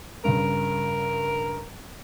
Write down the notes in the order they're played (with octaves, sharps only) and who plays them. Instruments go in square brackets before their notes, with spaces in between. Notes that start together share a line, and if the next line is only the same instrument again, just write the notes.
[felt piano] G2 C#3 [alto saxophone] A#4